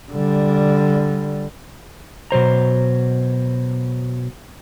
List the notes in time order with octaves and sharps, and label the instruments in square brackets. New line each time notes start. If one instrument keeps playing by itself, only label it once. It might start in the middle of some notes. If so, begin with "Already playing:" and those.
[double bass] D3 G3
[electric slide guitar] B2 F#3 C5 A#5